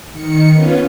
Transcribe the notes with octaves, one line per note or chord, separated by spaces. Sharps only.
D#3 C#7
B3 C#4 F4